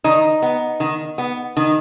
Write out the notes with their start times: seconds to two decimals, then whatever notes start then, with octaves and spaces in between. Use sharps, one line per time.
0.04 D#3 D#4
0.42 B3
0.80 D#3
1.18 B3
1.57 D#3